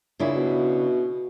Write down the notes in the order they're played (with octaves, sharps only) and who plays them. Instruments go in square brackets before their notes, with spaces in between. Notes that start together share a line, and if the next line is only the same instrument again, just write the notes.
[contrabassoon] A#2 [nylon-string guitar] C#3 D4 E4
[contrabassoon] B2